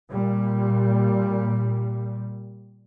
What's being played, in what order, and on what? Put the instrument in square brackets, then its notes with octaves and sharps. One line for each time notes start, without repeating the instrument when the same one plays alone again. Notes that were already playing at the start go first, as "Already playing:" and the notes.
[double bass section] A#2 G3